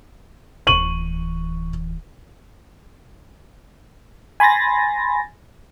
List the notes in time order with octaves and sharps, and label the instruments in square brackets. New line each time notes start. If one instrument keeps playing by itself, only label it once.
[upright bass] D1 E3 [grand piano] C#6 D#7 F#7
[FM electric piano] G#5 B5 C6 A6 A#6